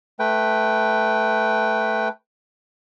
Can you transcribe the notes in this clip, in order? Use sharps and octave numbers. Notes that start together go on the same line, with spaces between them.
A3 B4 G5